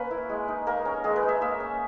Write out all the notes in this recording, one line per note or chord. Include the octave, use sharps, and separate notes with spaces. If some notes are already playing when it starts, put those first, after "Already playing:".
Already playing: A#3 C#4 B4
E4
G#3
D#4
A#3 A#4
C#4
G#3 G#4
B4
D#4
E5
A#3 E5
C#4